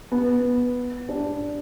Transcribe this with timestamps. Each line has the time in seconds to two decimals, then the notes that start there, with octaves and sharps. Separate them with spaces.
0.12 B3
1.09 D4